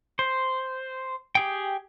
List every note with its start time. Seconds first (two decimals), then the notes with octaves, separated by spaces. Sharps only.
0.19 C5
1.35 G4 G#4 G5